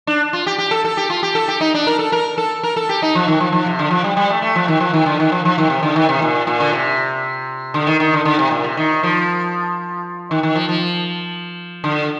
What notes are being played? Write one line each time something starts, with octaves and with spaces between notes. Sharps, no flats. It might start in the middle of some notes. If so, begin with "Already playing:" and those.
D4
F4
G4
G4
A4
A4
G4
F4
G4
A4
G4
D#4
D4
A#4
A4
A#4
A4
A#4
A4
G4
D#4
F3
D#3
F3
F3
C3
D3
F3
G3
G3
A3
A3
F3
D#3
F3
D#3
D3
D#3
F3
F3
D#3
C3
D3
D#3
C3
A#2
A#2
D3
C3
D3
D#3
D#3
D3
D3
C3
A#2
C3
D#3
F3
D#3
D#3
F3
F3
D3